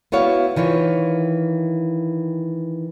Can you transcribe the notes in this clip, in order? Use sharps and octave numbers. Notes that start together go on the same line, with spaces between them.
B3 E4 F#4 C#5 F5
D#3 E3 F4 C#5